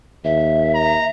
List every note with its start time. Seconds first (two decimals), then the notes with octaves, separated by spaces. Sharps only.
0.24 D#2 E5
0.75 A#5